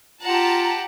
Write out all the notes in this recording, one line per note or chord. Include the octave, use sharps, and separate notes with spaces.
F4 G4 F#5 A5 A#5